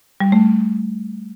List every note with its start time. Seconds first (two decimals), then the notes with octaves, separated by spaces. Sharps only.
0.20 G3
0.32 A3